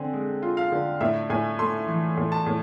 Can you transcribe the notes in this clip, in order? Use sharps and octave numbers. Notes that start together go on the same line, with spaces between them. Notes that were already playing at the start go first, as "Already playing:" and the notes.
Already playing: D3 C4 G#5
G#3
F4
F5
D3
A2 E5
A2 G#5
A3 C6
E3
A2
A5
A2